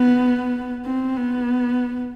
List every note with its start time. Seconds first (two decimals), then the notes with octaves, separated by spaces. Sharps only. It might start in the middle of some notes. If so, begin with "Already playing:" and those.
Already playing: B3
0.86 C4
1.17 B3